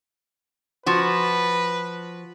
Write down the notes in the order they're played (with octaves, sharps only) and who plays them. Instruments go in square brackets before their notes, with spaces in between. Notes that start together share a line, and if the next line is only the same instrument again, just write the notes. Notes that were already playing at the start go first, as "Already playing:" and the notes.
[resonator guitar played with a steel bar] F3 F#4 [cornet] B4